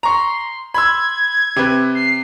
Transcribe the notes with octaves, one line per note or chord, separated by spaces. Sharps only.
A#5 C6 C#6
B5 C6 E6 G#6
C3 B4
C7